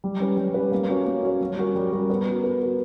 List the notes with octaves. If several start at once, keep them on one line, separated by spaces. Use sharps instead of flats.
G3
C#4 G4 B4
G3
C#4 G4 B4
A#3
C#4 F#4 C#5
A#3
C#4 F#4 C#5
G3
C#4 F#4 A#4
G3
C#4 F#4 A#4
B3
F#4 A#4
B3
F#4 A#4